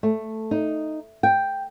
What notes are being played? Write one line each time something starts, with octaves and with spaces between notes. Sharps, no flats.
A3
D#4
G5